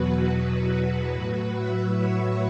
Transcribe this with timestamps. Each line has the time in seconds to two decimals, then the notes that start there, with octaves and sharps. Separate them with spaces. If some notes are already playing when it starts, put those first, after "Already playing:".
Already playing: E2 B2 F#3 F#4 B4
0.26 F#4 B4
1.12 A2 F#3 F#4 B4
1.55 B4 E5
1.98 C#5 F#5